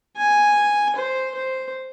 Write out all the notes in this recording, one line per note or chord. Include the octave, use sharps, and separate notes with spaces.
G#5
C5
C5